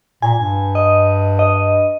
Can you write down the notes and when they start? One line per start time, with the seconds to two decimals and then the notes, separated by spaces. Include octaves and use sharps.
0.22 A#2 G#5
0.37 G2
0.75 D#5
1.39 D#5